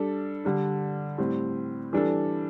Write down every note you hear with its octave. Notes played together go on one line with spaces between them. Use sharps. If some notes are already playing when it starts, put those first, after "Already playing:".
Already playing: G3 D4 A4
D3 G3 D4
A2 G3 C4
E3 G3 D4 A4